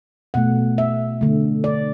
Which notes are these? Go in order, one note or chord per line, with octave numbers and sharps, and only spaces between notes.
B2 A3 F#5
E5
D3 A3
D5